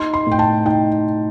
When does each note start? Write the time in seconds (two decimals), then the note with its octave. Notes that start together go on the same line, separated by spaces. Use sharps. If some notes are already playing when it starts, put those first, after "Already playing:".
Already playing: D#4 C6
0.14 C6
0.27 A2 G5
0.39 A5
0.66 D#4 G5